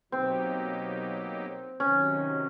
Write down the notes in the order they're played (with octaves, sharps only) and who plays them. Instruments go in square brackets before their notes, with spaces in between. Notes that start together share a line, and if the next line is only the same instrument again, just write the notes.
[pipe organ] B2 F#3 A#3 D#4 G4 [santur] C4
[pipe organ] C3 D#3 F#3 [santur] C#4